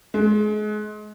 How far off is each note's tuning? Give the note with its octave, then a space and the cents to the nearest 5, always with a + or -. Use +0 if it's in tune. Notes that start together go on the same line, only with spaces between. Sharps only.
G#3 +30